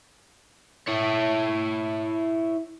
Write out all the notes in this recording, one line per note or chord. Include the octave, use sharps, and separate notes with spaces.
E4 C#5